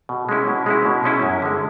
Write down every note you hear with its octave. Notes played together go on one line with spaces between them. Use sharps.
B2
G#3 C#4 E4
B2
G#3 C#4 E4
B2
G#3 C#4 E4
F#2
D3 G#3